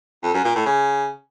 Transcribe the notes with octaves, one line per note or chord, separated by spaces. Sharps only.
F2
F#2
A#2
A2
C#3